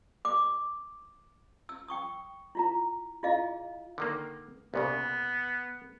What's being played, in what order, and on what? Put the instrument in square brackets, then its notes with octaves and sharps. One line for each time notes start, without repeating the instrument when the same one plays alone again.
[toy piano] D6
E6
G5 C#6 D#6
E4 F4 A#5
E4 F4 G#4 D#5 F5
[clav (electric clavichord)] D3 D#3 A#3
[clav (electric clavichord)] C2 A#2 C#3 [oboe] B3